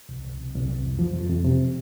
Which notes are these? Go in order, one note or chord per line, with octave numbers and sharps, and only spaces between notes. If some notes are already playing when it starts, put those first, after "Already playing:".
C2
C2
C3
C2
C2
F2
F3
F2
F2
C3